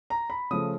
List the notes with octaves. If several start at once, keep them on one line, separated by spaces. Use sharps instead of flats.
A#5
B5
C#3 F3 A3 D#6